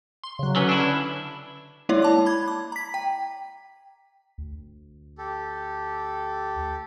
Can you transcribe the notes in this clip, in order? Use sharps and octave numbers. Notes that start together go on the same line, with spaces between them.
C6
C#3 F#3
D3 F#3 C#4 B4
D4 E4
G#3 A#3 E4 C#5 D5
A5 D6
B5 G#6
D6
A#5 B6
G5
D2
G4 A4